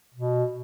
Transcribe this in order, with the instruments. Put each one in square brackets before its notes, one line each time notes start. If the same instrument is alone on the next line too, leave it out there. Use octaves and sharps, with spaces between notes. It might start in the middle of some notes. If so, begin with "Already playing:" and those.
[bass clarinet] B2